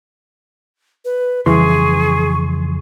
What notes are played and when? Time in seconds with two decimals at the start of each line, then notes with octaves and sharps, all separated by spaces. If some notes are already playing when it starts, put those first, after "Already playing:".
1.05 B4
1.46 F2 C#3 E3 G3 G#4 C6 C#6